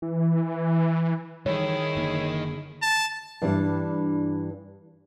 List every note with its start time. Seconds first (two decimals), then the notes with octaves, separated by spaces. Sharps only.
0.02 E3
1.46 D#3 E3 G3 E4 G#4 C#5
1.96 F#1 D3 A#3
2.83 A5
3.42 G2 E3 G3 D4